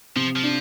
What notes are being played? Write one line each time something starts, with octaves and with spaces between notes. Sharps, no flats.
C3 F3
F3
D4